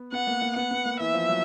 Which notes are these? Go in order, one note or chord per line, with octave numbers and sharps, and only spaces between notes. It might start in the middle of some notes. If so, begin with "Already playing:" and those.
Already playing: B3
B3 F#5
A#3
A#3
B3 F#5
B3
A#3
E3 E5
F3
F#3